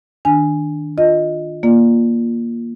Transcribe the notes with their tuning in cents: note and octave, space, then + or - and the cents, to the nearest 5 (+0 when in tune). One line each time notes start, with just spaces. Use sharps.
D#3 +0 D4 +0 G#5 +0
F4 +15 D#5 +0
A#3 +10 F4 +0 D5 +0